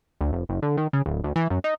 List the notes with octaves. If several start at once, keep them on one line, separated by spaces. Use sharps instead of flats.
D2
F1
F#1
D3
D#3
C#3
D1
D2
E3
F#2
D#4